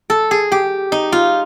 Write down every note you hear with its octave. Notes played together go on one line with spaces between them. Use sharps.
A4
G#4
G4
D#4
F4